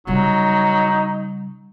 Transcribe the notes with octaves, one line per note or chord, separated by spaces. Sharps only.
C#3 F#3 G3 D#4